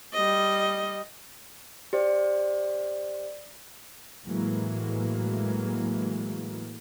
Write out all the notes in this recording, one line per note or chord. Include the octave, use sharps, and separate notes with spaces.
G3 D#5
G4 C5 D5
A2 E3 F#3 G#3 A#3